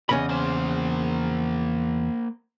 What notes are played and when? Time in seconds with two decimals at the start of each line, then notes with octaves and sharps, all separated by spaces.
0.09 E2 C#3 D#5 B5
0.29 A#3 C5